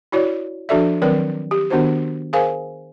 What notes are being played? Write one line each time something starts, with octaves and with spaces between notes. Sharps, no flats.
E4 F#4 C#5 D5
F3 D4 F#4 A4 D5 E5
D#3 F#3 C4 A#4 B4 D5
G4
D#3 B3 D4 F#4 C5
G#4 A#4 C5 F5 G#5